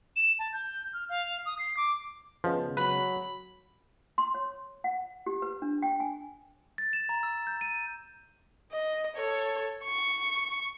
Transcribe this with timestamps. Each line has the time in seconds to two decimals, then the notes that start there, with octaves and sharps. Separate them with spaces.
0.16 E7
0.39 A5
0.53 G6
0.93 F6
1.09 F5
1.45 D#6
1.59 C7
1.77 D6
2.44 C#3 F3 G#3 B3
2.77 F#3 B4 B5
4.18 C6
4.34 C#5
4.84 F#5
5.26 G4
5.42 B4
5.62 D4
5.82 G5
6.00 G#5
6.78 A6
6.93 E7
7.09 A#5
7.23 E6
7.47 G6
7.61 D#7
8.72 D#5
9.16 A4 C#5
9.84 C#6